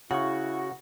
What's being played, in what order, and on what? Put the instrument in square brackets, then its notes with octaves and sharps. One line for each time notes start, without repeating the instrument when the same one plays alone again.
[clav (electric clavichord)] C#3 [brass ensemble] E4 [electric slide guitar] F#4 [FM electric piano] F#5 C#6